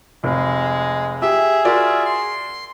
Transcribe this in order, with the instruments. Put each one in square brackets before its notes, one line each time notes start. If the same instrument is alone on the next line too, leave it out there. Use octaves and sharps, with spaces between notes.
[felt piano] F1 [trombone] G#3
[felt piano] G4 [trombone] G#4 [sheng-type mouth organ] E5
[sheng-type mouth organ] F4 E5 [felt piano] F#4 A#4 D5
[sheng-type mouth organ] C6